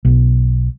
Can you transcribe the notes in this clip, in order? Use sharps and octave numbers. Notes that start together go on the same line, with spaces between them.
B1